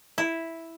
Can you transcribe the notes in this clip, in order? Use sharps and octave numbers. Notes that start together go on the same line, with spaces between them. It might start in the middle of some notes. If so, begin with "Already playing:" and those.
E4